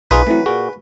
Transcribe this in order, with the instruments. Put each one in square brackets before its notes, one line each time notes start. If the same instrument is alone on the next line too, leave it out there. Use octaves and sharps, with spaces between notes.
[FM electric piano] B1 [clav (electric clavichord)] D#4 F4 G#4 [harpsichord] B4
[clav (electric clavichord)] E3 F#3 [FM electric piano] A3 C4 E4
[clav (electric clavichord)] A#2 F#4 [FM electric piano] G#4